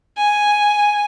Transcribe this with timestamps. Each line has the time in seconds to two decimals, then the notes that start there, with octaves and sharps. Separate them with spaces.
0.17 G#5